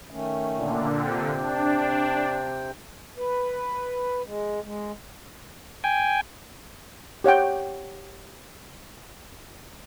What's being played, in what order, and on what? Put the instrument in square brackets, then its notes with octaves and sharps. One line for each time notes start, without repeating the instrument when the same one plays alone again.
[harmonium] D#3 A3 C#4
[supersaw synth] A#2 D3
[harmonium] C3 C4 G5
[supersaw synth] D4
[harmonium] B4
G#3
G#3
[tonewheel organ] G5 G#5
[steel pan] G4 C#5 F#5 G5